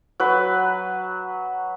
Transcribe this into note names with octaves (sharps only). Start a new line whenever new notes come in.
F#3 B4